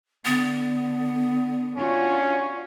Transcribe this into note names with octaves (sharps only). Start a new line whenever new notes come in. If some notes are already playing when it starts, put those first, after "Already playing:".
D3 B3
C#4 D4 F4 F#4